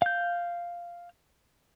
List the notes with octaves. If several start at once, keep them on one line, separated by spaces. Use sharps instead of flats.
F5 G6